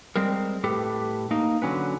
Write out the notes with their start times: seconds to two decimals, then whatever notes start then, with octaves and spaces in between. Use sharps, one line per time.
0.16 G3 G#3 C4 A#4
0.64 A2 G4 A4 B4
1.31 A#3 D#4
1.62 D3 F#3 C#4 B4